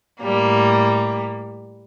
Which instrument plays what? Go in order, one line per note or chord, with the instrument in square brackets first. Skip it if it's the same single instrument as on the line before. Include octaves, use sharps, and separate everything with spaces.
[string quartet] A2 G3 A#3